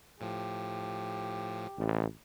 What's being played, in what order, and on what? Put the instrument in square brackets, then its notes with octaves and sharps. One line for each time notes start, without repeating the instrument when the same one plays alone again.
[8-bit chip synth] A2 F3 [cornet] G4
[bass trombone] A1